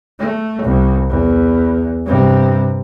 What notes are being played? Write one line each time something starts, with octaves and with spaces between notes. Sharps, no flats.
A3
C2
E2
G2 C3